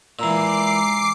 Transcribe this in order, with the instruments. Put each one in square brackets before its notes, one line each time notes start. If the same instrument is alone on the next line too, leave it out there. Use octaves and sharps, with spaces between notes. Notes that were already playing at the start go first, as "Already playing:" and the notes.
[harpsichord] A#2 E3 [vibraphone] G#3 A#5 E6 [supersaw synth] D6 C7